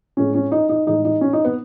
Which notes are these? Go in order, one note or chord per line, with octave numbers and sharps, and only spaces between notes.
A2 G#3 C#4
C#4
D#4
D#4
A2 E3 G#3 D#4
D#4
C#4
D#4
B3